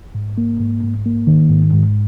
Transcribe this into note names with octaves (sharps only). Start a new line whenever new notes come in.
G#2
A#3
G#2
G#2
A#3
D#3
G#2
G#2